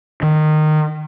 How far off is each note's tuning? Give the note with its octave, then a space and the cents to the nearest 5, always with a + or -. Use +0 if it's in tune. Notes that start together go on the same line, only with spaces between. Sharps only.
D#3 -20